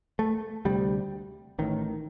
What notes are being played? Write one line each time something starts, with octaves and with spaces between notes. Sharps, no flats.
A3
D2 C3 G3
A1 A2 D#3